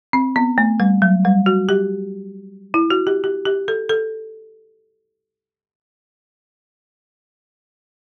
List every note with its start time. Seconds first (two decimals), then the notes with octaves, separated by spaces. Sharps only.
0.13 C4
0.36 B3
0.58 A3
0.80 G3
1.02 F#3
1.25 G3
1.46 F#4
1.69 G4
2.74 E4
2.90 F#4
3.07 G4
3.24 G4
3.45 G4
3.68 A4
3.89 A4